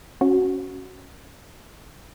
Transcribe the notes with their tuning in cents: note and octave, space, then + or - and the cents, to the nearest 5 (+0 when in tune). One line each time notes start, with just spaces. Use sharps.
C#4 +0 F#4 +0